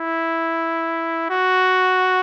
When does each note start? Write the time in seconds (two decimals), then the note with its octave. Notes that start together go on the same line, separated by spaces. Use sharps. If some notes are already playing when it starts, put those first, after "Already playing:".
Already playing: E4
1.30 F#4